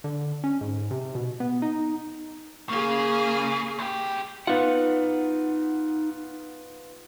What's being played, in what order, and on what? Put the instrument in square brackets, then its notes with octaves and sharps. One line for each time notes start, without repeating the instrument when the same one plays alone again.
[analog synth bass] D3
C#4
G#2
C3
B2
B3
D#4
[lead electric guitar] C#3 [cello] A#3 G#4
[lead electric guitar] C2 G4
[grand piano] B3 F4 [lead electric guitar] D#4 F#5